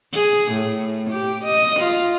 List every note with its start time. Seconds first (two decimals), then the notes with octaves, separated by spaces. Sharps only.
0.14 G#4
0.52 A2
1.10 G4
1.44 D#5
1.80 F4